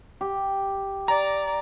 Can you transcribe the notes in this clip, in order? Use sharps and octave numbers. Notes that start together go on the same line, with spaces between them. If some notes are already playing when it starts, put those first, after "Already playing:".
G4
D5 A#5